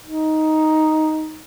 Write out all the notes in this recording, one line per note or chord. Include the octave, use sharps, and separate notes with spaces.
D#4